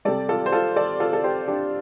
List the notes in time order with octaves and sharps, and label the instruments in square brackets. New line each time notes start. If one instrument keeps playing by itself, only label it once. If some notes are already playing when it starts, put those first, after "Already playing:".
[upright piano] C3 G3 A4 D5
F4 A4
C5
F4 A4
A4 D5
F4 A4
A4
G4 C5
D4 G4